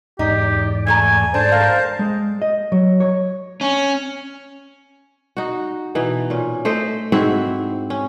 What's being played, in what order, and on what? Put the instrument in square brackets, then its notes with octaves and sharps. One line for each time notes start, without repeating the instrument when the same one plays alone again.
[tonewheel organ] E2 G#2 D5 [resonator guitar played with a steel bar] D#4 [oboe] G4
[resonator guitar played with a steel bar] E3 A3 A#5 [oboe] G#5
[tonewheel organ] G#2 A4 [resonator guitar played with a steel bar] D4 [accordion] C5 A5
[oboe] A#4 [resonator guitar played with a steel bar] F5
[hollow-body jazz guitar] G#3
D#5
F#3
C#5
[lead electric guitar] C#4
[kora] D#4 F#4
B2 E3 D#4
A#2 C#4
A3 C5 D#5
G#2 C4 E4 F#4
C#4